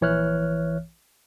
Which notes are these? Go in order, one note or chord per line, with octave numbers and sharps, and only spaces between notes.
A#1 E3 C#5 E5 F6 F#6